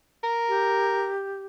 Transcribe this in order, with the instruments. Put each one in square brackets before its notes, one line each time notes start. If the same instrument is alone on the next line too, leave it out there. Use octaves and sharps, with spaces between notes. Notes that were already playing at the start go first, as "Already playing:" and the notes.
[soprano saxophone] A#4
[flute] G4